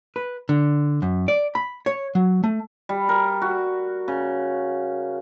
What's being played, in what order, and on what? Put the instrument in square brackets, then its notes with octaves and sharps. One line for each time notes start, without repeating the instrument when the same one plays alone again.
[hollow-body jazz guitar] B4
D3
F#2
D5
B5
C#5
F#3
A3
[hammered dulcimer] G3
A#4
F#4
C#3